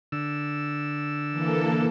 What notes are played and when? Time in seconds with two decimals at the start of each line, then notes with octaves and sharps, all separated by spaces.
0.12 D3 E6
1.32 E3 A#3 A4